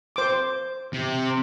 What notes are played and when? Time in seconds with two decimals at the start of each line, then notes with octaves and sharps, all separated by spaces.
0.16 C5 D6
0.94 C3